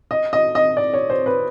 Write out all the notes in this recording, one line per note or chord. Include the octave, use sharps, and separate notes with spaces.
D#5
D#5
D#5
D5
C#5
C5
B4